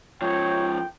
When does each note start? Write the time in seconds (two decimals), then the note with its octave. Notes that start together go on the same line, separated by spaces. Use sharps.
0.22 G#2 F3 C#5 G5